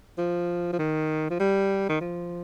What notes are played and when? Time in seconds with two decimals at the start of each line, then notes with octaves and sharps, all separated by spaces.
0.18 F3
0.73 F3
0.78 D#3
1.30 F3
1.39 G3
1.89 D#3
2.00 F3